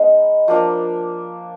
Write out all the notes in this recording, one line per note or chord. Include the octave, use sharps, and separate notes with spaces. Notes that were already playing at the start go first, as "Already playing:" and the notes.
Already playing: G#3 B3 D#4
F3 A#3 D4